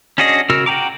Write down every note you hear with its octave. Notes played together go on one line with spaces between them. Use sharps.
C#4 D4 F#4 G#4 D#5
C#3 F#4 A#4 E6 F6
F#4 G5 A#5 D6